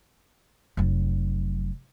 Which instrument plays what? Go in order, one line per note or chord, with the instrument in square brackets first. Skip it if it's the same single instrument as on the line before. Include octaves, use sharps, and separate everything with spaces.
[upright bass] F1 F#3